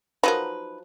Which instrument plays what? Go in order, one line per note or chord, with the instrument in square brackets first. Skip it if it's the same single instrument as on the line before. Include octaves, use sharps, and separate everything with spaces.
[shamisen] F3 F#3 A#4 [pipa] D#4 B4